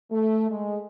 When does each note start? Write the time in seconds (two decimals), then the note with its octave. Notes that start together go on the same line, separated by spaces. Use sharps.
0.11 A3
0.50 G#3